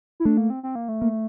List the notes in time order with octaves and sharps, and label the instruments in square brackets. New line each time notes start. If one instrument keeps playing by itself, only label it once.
[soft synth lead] E4
[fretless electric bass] A3 [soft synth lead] D4
[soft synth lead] A#3
C4
C4
A#3
A3
[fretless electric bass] A#3